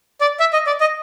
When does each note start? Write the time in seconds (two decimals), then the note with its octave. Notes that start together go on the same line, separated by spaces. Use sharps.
0.21 D5
0.40 E5
0.53 D#5
0.67 D5
0.80 D#5